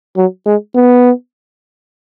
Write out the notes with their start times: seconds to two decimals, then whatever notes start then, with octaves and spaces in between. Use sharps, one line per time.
0.17 F#3
0.46 G#3
0.76 B3